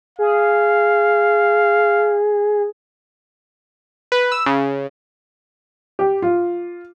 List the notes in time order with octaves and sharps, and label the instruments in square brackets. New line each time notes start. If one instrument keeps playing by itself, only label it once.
[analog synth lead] G#4 [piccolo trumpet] F5
[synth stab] B4
E6
C#3
[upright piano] G4
F4